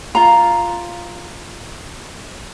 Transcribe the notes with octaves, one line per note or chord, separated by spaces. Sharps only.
F4 F5 A#5